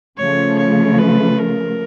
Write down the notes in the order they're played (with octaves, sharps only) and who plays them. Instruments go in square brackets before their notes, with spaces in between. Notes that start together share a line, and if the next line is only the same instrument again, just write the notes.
[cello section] C#3 F3 A3 [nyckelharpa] C#5
[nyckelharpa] C#5
B4
A#4